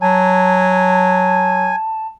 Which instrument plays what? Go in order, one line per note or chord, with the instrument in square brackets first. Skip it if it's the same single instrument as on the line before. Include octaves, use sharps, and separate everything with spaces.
[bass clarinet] F#3 [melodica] G#5 [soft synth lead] A5